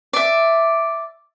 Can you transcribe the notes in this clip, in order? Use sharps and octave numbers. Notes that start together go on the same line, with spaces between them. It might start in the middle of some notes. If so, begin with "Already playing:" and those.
D5 E5